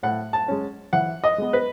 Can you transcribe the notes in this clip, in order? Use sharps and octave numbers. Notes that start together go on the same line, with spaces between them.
A2 F#5
A5
G#3 C#4
E3 F#5
D#5
G#3 B3
B4